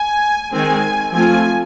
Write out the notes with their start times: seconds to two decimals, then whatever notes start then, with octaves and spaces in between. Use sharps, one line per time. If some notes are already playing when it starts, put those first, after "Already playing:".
Already playing: G#5
0.52 D#3 G#3 C4 G#5
1.12 F3 A3 C4 F4 G#5